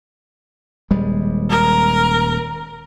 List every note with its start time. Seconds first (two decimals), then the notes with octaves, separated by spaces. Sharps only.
0.91 D#1 G3 G#3
1.49 A#4